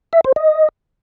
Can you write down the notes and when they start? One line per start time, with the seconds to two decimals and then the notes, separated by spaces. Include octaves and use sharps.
0.13 E5
0.24 C5
0.36 D#5